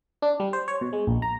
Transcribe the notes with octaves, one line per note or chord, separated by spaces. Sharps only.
D4
G3
C5
C#5
B2
G#3
A#1
A#5